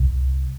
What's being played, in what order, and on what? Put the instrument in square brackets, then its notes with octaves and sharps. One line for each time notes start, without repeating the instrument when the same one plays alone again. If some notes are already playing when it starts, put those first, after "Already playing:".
Already playing: [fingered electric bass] C2